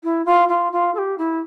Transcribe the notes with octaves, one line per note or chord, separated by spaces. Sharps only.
E4
F4
F4
F4
A4
G4
E4